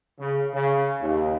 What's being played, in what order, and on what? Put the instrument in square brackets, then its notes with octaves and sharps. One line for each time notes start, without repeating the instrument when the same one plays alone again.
[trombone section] C#3
C#3
D#2